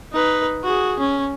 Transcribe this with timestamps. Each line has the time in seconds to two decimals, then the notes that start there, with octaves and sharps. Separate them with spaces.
0.13 D#4 B4
0.64 F#4 G#4
0.99 C#4